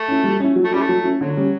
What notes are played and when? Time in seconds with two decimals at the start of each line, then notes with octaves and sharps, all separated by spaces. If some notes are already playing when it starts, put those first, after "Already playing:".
Already playing: A3
0.08 C#4 E4
0.24 G3
0.40 C#4 E4
0.55 F#3
0.64 A3
0.72 G3 C#4 E4
0.81 A3
0.89 F#3
1.04 C#4 E4
1.20 D3 F#3
1.37 G3 C#4